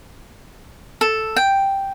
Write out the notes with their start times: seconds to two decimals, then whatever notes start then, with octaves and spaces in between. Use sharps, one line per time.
1.01 A4
1.36 G5